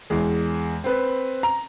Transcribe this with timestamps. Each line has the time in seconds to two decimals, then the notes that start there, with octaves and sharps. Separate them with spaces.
0.10 E2 G#3
0.84 C4 B4
1.43 A#5